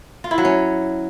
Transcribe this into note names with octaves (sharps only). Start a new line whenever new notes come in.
F4
E4
F#3
C#4